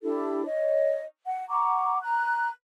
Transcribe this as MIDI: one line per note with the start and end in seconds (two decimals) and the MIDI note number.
0.03 0.43 62
0.03 0.43 64
0.03 0.43 67
0.03 0.43 69
0.45 1.02 73
0.45 1.02 75
1.26 1.48 78
1.49 1.99 78
1.49 1.99 82
1.49 1.99 85
1.49 1.99 86
2.02 2.48 82
2.02 2.48 90